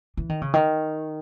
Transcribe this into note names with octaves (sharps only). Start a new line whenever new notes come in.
E3
D#3
C#3
D#3